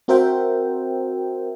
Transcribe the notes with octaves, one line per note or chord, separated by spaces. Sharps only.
C4 F#4 A#4 C5 E5 G5